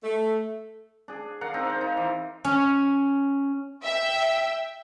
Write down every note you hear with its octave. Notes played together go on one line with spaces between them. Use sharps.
A3
D4 G#4
D4 A#4 F5 F#5
C4 D4 D#4 A#4
C5 F5
D#4
E3
C#4
E5 G5